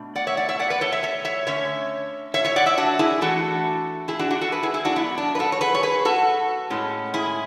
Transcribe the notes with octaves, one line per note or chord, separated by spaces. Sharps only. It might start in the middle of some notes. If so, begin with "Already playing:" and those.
Already playing: B2 A3 D4
D5 F#5
C#5 E5
D5 F#5
C#5 E5
D5 F#5
B4 D5
A4 C#5
C#5 E5
C#5 E5
C#5 E5
D3 A3 C#4 C#5 E5
C#5 E5
C#5 E5
D5 F#5
C#5 E5
D4 F#4
E4 G#4
E3 A3 D4 F#4 A4
E4 G#4
D4 F#4
D4 F#4
F#4 A4
G#4 B4
E4 G#4
E4 G#4
D4 F#4
B2 F#3 B3 D4 E4
D4
B4
F#4 A4
C#5
G#4 B4
C#5
G#4 B4
F#4 A4
A2 G#3 C#4
E4 G#4